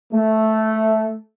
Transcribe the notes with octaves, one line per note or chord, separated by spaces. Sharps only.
A3